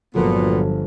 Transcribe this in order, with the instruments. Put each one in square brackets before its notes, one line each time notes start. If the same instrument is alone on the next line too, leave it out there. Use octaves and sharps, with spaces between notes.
[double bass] G1 [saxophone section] A#2 B3 [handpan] D3 F3 A4 [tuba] F#3